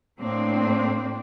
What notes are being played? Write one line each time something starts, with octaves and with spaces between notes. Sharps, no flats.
A2 A#3 C4 D4